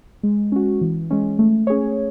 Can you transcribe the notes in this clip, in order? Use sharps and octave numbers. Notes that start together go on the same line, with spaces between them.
G#3
C#4 F#4
E3
G#3 C#4
A3
C#4 G#4 C#5